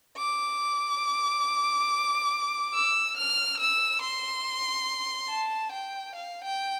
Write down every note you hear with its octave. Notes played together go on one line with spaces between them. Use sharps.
D6
E6
F6
E6
C6
A5
G5
F5
G5